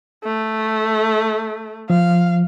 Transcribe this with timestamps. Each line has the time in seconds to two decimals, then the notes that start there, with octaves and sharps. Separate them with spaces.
0.24 A3
1.90 F3 F5